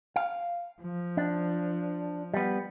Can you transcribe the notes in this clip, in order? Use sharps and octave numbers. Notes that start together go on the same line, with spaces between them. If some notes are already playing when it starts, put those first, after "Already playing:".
F5
F3
D4
G3 B3